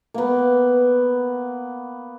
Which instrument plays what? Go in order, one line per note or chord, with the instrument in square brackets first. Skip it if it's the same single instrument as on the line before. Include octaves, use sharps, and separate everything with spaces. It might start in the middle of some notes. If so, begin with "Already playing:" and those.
[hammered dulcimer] A#3 B3